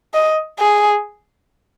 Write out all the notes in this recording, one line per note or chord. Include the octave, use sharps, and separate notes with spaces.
D#5
G#4